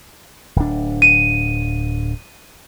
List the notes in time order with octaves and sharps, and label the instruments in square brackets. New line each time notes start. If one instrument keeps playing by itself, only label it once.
[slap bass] D1 D4
[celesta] D#7